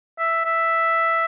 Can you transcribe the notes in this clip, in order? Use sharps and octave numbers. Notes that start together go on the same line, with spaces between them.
E5
E5